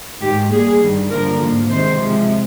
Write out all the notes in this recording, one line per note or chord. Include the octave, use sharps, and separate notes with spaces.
G#2 D#3 G#3 G4
A#2 G3 A#3 G#4
G2 D#3 G3
G2 D3 F3 A#3 A#4
G#2 F3 A#3
C3 D#3 G#3 C5
C3 F3 G#3